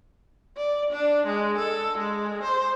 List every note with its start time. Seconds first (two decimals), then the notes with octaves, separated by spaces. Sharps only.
0.57 D5
0.91 D4
1.27 G#3
1.58 A4
1.98 G#3
2.43 C5